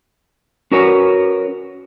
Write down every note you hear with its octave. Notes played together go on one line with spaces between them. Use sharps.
C#4 F#4 A#4 B4 C#5